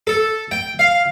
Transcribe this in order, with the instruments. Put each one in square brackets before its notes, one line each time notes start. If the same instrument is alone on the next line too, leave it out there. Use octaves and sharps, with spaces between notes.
[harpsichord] A4
G5
F5